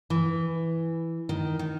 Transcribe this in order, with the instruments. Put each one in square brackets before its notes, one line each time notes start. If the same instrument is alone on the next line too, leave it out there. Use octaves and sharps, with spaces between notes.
[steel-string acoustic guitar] E3
D#3
D#3